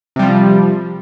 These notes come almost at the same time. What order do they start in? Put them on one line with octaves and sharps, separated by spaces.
C3 G3 F3